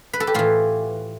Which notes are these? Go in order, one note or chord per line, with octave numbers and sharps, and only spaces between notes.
B4
A4
G4
A2 E3 F4